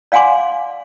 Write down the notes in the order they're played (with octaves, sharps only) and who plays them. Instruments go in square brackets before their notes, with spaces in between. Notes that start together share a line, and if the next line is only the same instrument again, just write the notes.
[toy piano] D5 F5 F#5 G#5 C6 D6